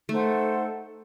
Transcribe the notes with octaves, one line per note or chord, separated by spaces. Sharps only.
A3 D#4 A4 C5 F#5